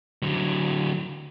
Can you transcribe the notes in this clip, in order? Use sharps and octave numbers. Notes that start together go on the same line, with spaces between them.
D3 F#3